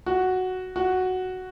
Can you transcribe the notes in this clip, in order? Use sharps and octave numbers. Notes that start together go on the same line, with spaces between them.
F#4
F#4